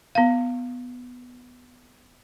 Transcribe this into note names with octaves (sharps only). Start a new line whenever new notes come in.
B3 F5